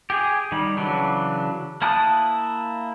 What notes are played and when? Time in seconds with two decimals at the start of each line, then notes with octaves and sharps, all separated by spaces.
0.10 G4 G#4
0.52 D#3 G3
0.77 C#3 E3 F#3 D4
1.82 A#3 E4 A5 D#6 F#6